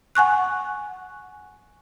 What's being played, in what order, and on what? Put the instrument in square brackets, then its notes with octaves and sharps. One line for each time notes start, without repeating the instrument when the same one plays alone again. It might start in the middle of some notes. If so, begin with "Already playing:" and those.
[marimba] F#5 G#5 C#6 F#6